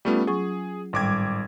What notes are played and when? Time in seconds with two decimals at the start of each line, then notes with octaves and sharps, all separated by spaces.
0.05 G3 A3 B3 C#4 F4
0.27 F#3 G#4 C#6
0.93 G#1 A2 G3 D6 G#6